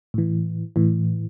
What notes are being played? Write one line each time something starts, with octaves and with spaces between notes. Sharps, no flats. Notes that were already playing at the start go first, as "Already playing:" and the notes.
A2 E3
A2 E3